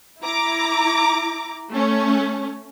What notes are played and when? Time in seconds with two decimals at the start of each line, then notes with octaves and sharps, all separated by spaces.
0.22 E4 A#5 D6
1.71 A3 C#4